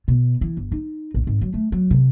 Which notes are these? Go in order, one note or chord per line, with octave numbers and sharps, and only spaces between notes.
B2
E3
G1
D#4
A#1
G#1
F#3
A3
F#3
C3